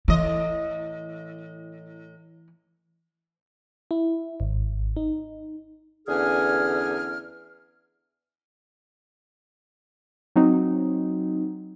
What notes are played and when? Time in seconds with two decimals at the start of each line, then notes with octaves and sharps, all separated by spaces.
0.08 A2 E3 D#5
3.91 E4
4.40 G#1
4.97 D#4
6.08 E2 D3 C#4 G#4 G#5 F6
10.36 F#3 C4 D#4